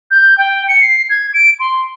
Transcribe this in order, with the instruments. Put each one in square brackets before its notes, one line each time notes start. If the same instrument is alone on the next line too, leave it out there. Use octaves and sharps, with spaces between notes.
[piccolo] G6
G5
C#7
C7
G#6
D7
C6